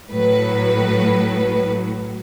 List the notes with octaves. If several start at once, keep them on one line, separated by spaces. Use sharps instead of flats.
A2 F#3 B4